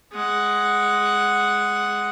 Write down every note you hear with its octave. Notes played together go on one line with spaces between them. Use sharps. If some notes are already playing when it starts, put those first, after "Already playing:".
G#3 F#5